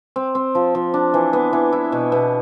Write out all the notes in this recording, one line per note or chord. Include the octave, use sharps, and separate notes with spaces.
C4
C4
F3
F3
D4
E3
B3
E3
E4
B2
B2